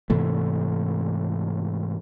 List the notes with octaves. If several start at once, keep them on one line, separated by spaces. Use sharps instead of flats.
G#2 C3 E3 A3